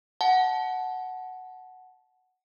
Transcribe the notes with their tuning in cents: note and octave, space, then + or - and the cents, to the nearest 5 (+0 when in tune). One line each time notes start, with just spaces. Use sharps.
F#5 +0 A5 -20